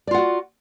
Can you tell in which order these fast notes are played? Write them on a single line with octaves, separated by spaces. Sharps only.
D5 F4 F#5 F#4